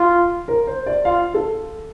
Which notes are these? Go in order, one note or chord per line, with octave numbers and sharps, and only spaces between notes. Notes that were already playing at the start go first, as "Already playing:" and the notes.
Already playing: F4
A#4
C5
D5
F4 F5
A4